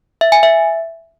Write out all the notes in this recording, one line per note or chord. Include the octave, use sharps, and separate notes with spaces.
E5
G#5
E5